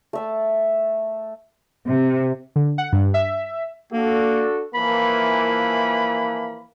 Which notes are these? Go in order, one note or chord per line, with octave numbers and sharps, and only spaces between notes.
A3 E5 A5
C3
D3
F#5
G2
E5
A#3 D4 F#4 A4
E3 F3 A#3 B5